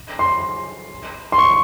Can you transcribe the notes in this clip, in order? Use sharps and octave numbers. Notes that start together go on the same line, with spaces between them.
C6
C6
C#6